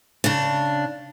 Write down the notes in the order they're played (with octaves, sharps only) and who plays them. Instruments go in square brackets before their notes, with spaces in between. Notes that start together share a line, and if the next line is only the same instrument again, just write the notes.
[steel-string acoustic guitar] C#3 D4